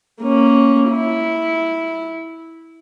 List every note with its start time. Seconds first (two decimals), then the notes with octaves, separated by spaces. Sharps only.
0.21 A#3 C#4
0.91 E4